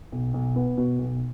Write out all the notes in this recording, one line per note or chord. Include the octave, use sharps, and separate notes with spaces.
B1
B1
B3
B2
B1